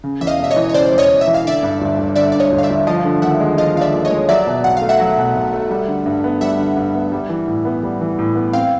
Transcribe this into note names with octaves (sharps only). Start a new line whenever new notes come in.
C#3
E2 E5
D#5 F5
E1 E5
C#5 D#5
E3
C#5
C#3 C5 D5
E2
C#5 D#5
E1
E5
E3
F5
D3 D5 E5
G2
G1
G1
D3 D5 E5
G2 D5
C#5 D#5
G1
F5
D5 E5
G1
F3 D#5 F5
D3
D#2 E5 F#5
G#3
F3 D#5 F5
D3 F5
D5 E5
D#2
C#5 D#5
G#3
F#3 D5 E5
B2
B1 F#5
A3 F5
E5 F#5
F#3
B2
B1
A3
G3
D3
G2
B3
G3 E5 F#5
D3
G2
B3
G3
E3
A2
B3
G3
E3
A2
B3
C4 F5 G5